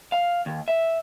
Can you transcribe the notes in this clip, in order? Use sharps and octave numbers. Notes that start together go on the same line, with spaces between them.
F5
D#2
E5